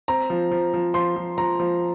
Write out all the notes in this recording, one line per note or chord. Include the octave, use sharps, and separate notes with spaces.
C4 A#5
F3
F3
F3
F3 C6
F3
F3 A#5
F3